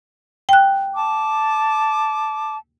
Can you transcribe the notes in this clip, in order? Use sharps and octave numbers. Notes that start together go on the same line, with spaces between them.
G5 F#6
A5 D6